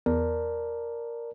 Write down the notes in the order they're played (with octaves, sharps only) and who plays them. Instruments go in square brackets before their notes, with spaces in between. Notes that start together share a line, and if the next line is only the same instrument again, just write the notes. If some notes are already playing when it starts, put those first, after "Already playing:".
[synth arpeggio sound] E2 [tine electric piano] A#4 D5 A5